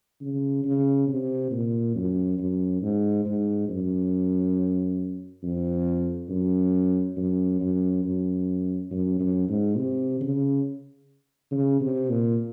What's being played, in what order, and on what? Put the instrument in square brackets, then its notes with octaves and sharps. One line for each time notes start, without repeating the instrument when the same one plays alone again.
[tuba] C#3
C#3
C3
A#2
F#2
F#2
G#2
G#2
F#2
F2
F#2
F#2
F#2
F#2
F#2
F#2
G#2
C3
C#3
C#3
C3
A#2